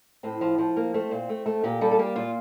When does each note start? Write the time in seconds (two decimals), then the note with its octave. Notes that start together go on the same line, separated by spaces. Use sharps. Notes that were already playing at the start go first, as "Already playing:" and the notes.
0.23 A2 C4
0.41 F3
0.58 F3
0.76 A#3
0.94 A3 C4
1.11 A#2
1.29 A3
1.46 A3
1.64 A#2 G4
1.81 G3 A4
1.91 A4
1.99 A#3 G4
2.16 A#2 F4